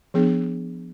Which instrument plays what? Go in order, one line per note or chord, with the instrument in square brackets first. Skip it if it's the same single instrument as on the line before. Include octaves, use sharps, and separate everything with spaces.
[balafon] F3 B3 D4 G#4